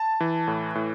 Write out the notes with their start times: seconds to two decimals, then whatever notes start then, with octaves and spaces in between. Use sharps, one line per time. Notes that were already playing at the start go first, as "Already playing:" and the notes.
Already playing: A5
0.20 E3
0.48 A2
0.75 A2